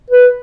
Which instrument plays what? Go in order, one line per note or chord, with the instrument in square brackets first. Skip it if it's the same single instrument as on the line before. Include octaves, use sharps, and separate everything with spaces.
[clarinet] B4